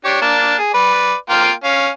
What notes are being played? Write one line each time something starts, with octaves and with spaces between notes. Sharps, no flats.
D4 G4 C#5
A#3 D4 A5
G#4
B4 D5
A#3 F4 G5
C#4 F5